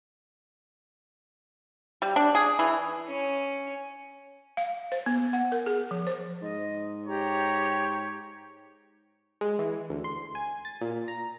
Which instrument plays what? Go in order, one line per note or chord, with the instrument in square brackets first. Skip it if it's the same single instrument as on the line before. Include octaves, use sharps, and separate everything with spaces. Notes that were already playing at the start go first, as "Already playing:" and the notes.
[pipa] G3
D4
G#4
E3
[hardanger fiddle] C#4
[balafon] F5
C5
B3
F#5
A#4
G#4
F3
C5
[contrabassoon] G#2 [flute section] D#5
[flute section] G4 A#5 [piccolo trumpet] C#5
[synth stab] G#3
E3
D2
C6
G#5
A6
A#2
A#5